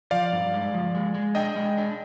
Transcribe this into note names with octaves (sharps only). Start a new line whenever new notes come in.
F3 D5 F5
G2
G#3
F3
G#3
G#3
D4 D#5 G5
G#3
D4